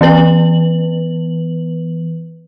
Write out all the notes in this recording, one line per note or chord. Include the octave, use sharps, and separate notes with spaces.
E3 B3 B4 F#7